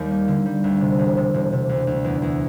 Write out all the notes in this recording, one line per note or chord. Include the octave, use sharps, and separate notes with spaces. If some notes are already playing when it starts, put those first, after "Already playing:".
Already playing: D#2 G3
A#3
D3
G3
D2
C3
E1
C3
E1
C3
D2
D2
E2
E2